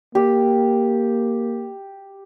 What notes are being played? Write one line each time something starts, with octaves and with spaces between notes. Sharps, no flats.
A#3 G4